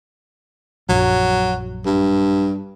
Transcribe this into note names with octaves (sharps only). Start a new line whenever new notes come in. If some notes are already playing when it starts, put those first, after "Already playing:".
A#1 F#2 F#3
G2